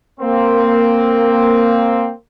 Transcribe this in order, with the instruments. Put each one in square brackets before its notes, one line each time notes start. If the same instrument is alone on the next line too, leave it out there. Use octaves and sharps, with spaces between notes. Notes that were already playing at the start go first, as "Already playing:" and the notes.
[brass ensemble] A#3 C4